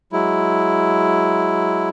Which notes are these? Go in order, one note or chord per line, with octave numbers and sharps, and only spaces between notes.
F#3 G#3 E4